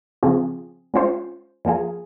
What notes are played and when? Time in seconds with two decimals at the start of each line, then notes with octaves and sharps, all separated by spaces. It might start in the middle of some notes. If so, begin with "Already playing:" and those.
0.23 C#3 F3 C4 F4 G#4
0.94 G#3 C#4 F4 C5
1.65 F3 A#3 F4 G#4